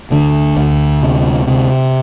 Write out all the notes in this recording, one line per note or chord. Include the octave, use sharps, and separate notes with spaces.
D2 D3
D2
C3
C3